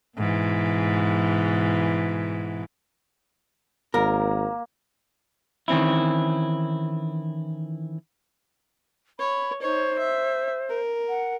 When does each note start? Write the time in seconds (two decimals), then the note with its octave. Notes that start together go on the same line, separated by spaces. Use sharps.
0.18 G#2 B2 E3
3.94 G#1 A#3 A#4
5.68 D#3 E3 C4 C#4 E4
9.19 C#5 B5
9.62 D#4 C5 C#5
9.99 E5
10.69 A#4
11.09 F#5